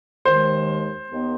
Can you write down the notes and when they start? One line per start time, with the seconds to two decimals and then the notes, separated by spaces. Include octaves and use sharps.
0.25 D#2 D#3 G#3 C5
1.10 D#2 D#3 B3